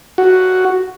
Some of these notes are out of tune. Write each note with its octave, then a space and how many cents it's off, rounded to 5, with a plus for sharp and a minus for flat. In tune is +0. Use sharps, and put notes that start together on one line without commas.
F#4 +5